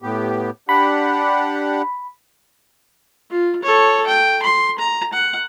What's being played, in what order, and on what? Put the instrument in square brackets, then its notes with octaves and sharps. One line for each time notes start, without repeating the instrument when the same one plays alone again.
[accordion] A2 B3 G4
[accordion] D4 G4 F#5 [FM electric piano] B5
[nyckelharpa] F4
A4 C#5
G5
C6
A#5
F#5